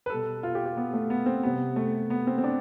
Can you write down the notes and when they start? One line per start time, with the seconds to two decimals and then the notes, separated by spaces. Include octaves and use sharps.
0.06 B4
0.10 B2 G3 A4
0.43 F4
0.55 G4
0.66 G4
0.77 B3
0.93 A3
1.10 B3
1.26 C4
1.43 C3 G3 B3
1.76 A3
2.10 B3
2.27 C4
2.38 C4
2.44 D4